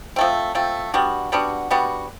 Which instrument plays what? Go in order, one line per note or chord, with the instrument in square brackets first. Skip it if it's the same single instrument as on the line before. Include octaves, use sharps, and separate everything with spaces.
[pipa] F3 A3 C4
F3 A3 C4
G3 B3 D4 F#4
G3 B3 D4 F#4
G3 B3 D4 F#4